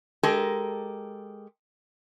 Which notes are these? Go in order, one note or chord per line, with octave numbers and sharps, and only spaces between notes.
G#3 G4 A4 A#4